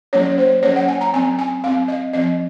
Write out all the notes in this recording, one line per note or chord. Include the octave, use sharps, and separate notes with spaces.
F#3 A#3 C#4 C#5
C5
F#3 A#3 C#4 C#5
F#5
G#5
A#5
F#3 C4 G#5
G#5
F#3 C4 F5
D#5
F3 C4 D#5